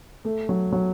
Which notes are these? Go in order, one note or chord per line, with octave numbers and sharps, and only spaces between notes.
A3
F#3
F#3